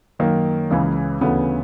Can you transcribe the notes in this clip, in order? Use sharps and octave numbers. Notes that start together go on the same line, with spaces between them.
F#2 D#3 A#3
C#2 C#3 E3
D2 C#3 E3 B3